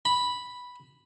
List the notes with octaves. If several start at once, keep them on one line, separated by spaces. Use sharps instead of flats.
B5